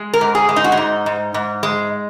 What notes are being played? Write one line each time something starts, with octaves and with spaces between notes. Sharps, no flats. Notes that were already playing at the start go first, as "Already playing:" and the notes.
Already playing: G#3
A#4
G#2
G#4
G#3
D#4
F#4
D#4
G#2
G#2
G#2
G#3